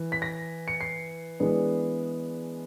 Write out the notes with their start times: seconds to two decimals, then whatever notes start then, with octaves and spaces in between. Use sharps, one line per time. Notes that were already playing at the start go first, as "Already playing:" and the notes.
Already playing: E3
0.12 B6
0.22 A#6
0.68 C#7
0.81 C7
1.40 E3 G#3 B3 D4